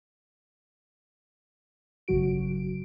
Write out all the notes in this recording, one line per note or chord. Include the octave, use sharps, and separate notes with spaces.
G#1 F#2 C#3 F#3 F#4 D7